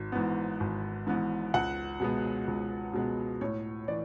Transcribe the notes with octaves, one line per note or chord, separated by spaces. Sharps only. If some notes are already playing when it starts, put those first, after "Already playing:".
Already playing: G#1
G#2 E3 B3
G#1
G#2 E3 B3
C#2 F#5
B2 G#3 B3
C#2
B2 G#3 B3
A2 C#5
E3 D5